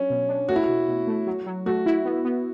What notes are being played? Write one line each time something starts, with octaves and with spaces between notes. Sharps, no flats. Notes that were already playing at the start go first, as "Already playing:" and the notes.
Already playing: F#3 C#4 D4
B2
D4
A3 F#4
E4
B2 F#4
B2
A3
F#3
F#3
A3 F#4
E4
B3
B3